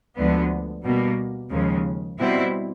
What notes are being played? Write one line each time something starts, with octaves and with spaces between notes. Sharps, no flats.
D2 D3 F3 G#3 B3
B2 G3 A#3
D#2 C#3 F3 G#3
B2 G3 C4 E4